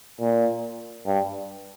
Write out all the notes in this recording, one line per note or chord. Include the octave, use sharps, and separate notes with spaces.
A#2
G2